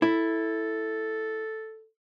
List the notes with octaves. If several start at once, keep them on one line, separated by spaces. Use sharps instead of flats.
E4 A4